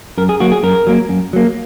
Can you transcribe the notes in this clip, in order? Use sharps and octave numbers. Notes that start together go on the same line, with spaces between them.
F#2 A#4
G#4
F#3 A#3 F#4
G#4
F#2 A#4
F#3 A#3
F#2
F#3 A#3